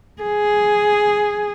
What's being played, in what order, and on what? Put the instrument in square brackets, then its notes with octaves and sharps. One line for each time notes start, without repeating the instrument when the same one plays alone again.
[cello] G#4